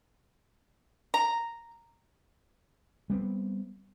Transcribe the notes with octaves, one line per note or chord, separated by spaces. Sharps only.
A#5
G3 B3 C4